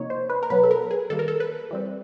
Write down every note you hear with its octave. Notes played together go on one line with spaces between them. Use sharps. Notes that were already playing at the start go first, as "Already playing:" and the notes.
Already playing: C3 F3 A#3 D#4 C#5
C5
B4
A#4
B2 F#3 B3 B4
A4
A#4
G#4
D#3 G3 A#3 A4
A#4
A4
B4
E3 G3 C4